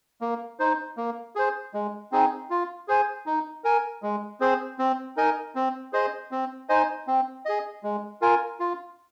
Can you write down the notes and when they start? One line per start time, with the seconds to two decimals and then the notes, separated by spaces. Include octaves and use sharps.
0.21 A#3
0.60 D#4 C5
0.97 A#3
1.36 G#4 C5
1.74 G#3
2.12 C4 D#4 G#4
2.50 F4
2.88 G#4 C5 G#5
3.26 D#4
3.64 A#4 G#5
4.03 G#3
4.40 C4 G#4 C5
4.79 C4
5.16 D#4 A#4 D#5 G#5
5.55 C4
5.93 G#4 C5 D#5
6.31 C4
6.69 D#4 C5 D#5 G#5
7.07 C4
7.45 G#4 D#5
7.83 G#3
8.21 F4 A#4 G#5
8.60 F4